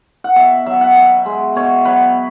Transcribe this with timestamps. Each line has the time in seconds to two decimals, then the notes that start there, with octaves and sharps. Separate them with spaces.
0.24 F#5
0.36 B2 E5
0.66 F#3 E5
0.81 F#5
0.96 B2 E5
1.26 G#3
1.56 B2 C#5
1.85 F#3 B4